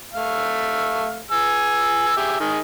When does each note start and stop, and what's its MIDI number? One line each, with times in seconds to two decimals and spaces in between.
0.14 1.21 57
0.14 1.21 77
1.31 2.14 68
1.31 2.14 80
1.31 2.14 88
2.17 2.37 67
2.17 2.37 68
2.17 2.37 76
2.40 2.59 51
2.40 2.59 68
2.40 2.59 75